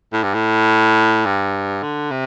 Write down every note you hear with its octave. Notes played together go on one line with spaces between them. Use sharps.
A2
G2
A2
G2
D3
C3